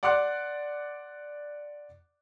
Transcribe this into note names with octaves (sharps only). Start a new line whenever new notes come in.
D5 F#5 C6 D6 F#6